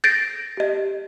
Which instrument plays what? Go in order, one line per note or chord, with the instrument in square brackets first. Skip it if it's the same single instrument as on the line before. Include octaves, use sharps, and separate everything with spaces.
[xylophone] G6 A6 A#6 C7 D7
G4 D#5